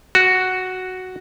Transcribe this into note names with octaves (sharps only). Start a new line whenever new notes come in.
F#4